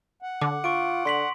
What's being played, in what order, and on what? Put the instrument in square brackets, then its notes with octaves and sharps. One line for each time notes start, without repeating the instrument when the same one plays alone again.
[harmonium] F#5
[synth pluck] D3 [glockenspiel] D6
[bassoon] F4 [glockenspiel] C#6 D7
[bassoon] D3 [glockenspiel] C6 B6 F#7